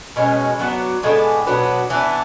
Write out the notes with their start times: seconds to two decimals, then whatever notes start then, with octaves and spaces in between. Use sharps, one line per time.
0.16 B2 G#3 C#4
0.59 F#3 B3 D4 F#4
1.03 A2 G#3 B3 D4
1.47 B2 F#3 B3 D4
1.90 E3 B3 D4